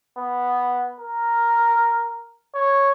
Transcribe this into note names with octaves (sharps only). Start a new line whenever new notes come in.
B3
A#4
C#5